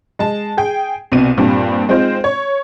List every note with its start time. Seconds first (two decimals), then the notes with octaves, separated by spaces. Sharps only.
0.19 G#3 A5
0.57 G#4 G5
1.12 C2 B2 C4 D#7
1.38 G2 A#2 G3 C4
1.89 G#3 C4 D#4 F4 C5
2.24 C#5